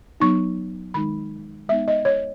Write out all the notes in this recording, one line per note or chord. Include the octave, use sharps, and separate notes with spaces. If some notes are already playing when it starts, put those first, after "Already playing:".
F#3 B3 D#4 C#6
D#3 G#3 D#4 B5
G#3 B3 D#4 E5
D#5
C#5